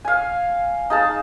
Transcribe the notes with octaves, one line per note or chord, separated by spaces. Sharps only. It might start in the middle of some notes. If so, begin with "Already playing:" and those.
F5 G#5
D#4 G#4 F5 A5